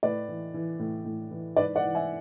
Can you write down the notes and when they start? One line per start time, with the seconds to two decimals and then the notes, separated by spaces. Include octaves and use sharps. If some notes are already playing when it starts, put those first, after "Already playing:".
0.03 A2 B4 D5
0.29 E3
0.54 E3
0.79 A2
1.05 A2
1.31 E3
1.56 G#2 B4 D5
1.76 D5 F#5
1.82 E3
1.95 E5 G#5